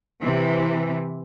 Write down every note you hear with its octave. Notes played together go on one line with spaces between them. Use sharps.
C3 E3